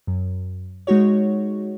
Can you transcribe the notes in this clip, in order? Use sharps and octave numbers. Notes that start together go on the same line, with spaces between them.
F#2
G#3 D#4 F#4 C#5